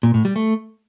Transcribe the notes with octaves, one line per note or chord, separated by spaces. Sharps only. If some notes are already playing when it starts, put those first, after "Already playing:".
A#2
A2
G3
A3